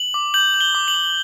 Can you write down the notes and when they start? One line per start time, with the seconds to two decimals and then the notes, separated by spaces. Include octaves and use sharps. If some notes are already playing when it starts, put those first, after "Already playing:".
Already playing: F#7
0.14 D6
0.34 G6 F#7
0.54 G6
0.61 G7
0.75 D6
0.88 F#7
0.94 D6